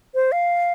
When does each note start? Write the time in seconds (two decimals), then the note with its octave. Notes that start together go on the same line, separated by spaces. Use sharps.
0.15 C5
0.32 F5